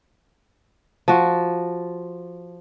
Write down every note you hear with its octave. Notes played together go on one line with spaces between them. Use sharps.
F3 F#4